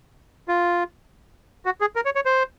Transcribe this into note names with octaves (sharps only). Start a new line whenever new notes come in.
F4
F#4
G#4
A#4
C#5
C#5
C5